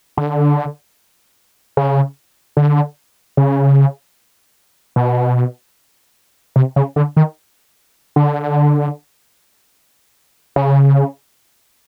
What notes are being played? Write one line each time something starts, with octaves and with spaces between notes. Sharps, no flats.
D3
C#3
D3
C#3
B2
C3
C#3
D3
D#3
D3
C#3